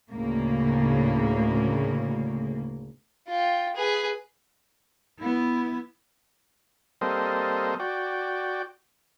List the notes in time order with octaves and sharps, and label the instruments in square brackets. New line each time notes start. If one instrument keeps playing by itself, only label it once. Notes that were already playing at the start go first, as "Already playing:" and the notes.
[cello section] D2 A2 C#3 A#3
[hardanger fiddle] F4 G5
G#4 B4
[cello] B3 E4
[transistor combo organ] G3 A#3 C4 A4 C5 D#5
F#4 D5 G5